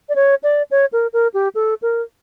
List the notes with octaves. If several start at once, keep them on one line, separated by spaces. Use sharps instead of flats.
D5
C#5
D5
C#5
A#4
A#4
G4
A4
A#4